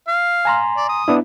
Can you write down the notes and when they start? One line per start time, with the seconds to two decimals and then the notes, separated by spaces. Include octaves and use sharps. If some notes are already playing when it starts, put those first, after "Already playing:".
0.08 F5
0.45 G#5 A#5 C6
0.77 D5
0.89 D#6
1.08 B3 D4 E4